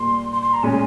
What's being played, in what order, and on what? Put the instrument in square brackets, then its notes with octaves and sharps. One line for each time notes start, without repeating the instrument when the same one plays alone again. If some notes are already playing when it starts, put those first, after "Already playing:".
Already playing: [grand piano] A#2 G3 A#3 [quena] C6
[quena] C6
C6
A#5
[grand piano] A#2 G#3 C#4 [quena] G#5